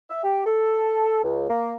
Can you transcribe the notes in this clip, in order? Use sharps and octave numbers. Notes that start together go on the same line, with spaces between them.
E5
G4
A4
C#2
A#3